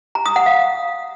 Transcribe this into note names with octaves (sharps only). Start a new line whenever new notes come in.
A#5
D#6
F#5
F5